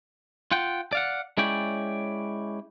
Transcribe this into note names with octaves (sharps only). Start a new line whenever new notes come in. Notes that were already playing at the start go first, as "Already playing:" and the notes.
F4 F#5 G5
D5 F5 F#5
G#3 C#4 E4 C#5 D5 G5